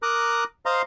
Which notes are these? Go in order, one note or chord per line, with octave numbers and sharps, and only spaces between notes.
A#4 A#5 D6 D#6 F#6
C5 D#5 F5 A#5 C6